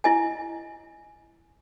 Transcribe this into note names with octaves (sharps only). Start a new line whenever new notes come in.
E4 D#5 G#5